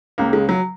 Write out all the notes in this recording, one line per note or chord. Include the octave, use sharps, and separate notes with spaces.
C#2 C#3 A#3
G#3
F#3